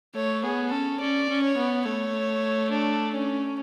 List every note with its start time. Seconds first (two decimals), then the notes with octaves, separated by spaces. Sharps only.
0.15 A3 C#5
0.43 B3 G#4
0.71 C#4 A4
1.00 C#4 D5
1.29 C#4
1.43 C#5
1.57 B3
1.85 A3 C#5
2.71 D4
3.13 C#4